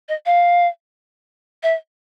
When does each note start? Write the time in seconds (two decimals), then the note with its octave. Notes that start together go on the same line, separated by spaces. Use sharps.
0.09 D#5
0.26 F5
1.63 E5